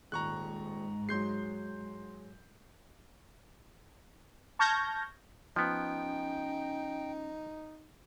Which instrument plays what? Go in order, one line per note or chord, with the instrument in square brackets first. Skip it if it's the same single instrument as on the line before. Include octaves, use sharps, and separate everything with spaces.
[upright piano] D#1 [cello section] G#2 [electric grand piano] A#5 C#6 F#6
[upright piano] F#3 G#3 [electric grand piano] C6 G6 C7
[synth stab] A5 C#6 F6 G6 G#6 A#6
[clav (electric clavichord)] F3 B3 [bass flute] C#4 [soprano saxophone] D#4 [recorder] G5